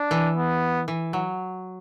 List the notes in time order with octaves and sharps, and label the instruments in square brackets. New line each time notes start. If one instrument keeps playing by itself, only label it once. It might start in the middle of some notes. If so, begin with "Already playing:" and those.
Already playing: [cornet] D4
[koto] E3
[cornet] B3
[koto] E3
F#3